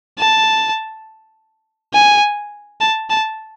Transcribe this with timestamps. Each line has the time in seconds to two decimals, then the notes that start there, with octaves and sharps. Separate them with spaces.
0.18 A5
1.93 G#5
2.81 A5
3.10 A5